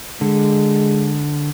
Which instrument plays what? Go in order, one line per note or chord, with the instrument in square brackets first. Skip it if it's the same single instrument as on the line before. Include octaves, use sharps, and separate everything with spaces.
[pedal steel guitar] D3 [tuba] G#3